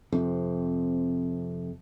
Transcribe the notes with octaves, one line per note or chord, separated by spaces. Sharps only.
F2 C3